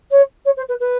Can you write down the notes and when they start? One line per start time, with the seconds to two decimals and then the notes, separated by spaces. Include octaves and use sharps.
0.11 C#5
0.45 C#5
0.57 C5
0.68 B4
0.80 B4